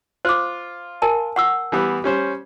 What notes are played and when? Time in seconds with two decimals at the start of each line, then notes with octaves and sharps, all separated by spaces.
0.25 F4 C5 D6
1.02 A#4 G#5 A5
1.36 F#5 C#6 E6
1.72 E3 G3 B3
2.04 G3 C#4 C5